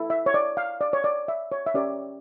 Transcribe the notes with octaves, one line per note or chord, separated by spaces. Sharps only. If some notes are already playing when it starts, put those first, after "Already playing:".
Already playing: E4 A4
E5
C#5
D5
F5
D5
C#5
D5
E5
C#5
E5
C#4 G4 A#4 C#5 D5